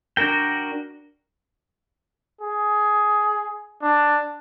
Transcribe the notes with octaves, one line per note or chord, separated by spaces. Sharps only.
D4 F#4 A#4 G5
G#4
D4